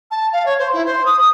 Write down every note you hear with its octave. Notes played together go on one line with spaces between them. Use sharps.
A5
F5
C#5
C5
E4
C5
D#6
D#6